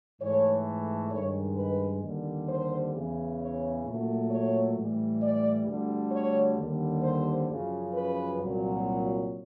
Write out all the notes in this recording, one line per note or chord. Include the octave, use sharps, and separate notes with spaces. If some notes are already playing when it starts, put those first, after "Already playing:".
G#2 E3 A3 C#5
G2 D#3 G#3 C#5
B4
D#2 D3 G3
C5
E2 C#3 E3
C#5
A#2 F#3 A3
C#5
A2 E3 G3
D5
D2 D3 G3
C#5
D#2 D3 G3
C5
F#2 C#3 F3
B4
C2 A#2 F#3